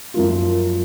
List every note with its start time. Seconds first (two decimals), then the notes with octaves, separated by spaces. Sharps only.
0.14 F#2 F3 A#3 F4